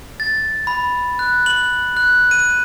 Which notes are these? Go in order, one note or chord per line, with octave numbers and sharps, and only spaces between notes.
A6
B5
F#6
F#7
F#6
D#7